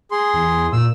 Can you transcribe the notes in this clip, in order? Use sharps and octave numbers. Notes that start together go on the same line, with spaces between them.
G#4 C6
E2
A#2 E6